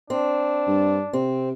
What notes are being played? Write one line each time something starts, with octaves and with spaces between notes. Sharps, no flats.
C4 D4
G2
C3 C4